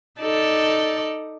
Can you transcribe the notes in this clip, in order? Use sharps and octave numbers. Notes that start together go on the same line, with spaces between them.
D#4 A4 D5